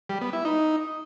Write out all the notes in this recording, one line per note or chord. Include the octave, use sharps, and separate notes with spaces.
G3
B3
E4
D#4